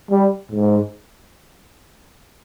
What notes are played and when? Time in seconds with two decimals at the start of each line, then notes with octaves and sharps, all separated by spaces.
0.10 G3
0.52 G#2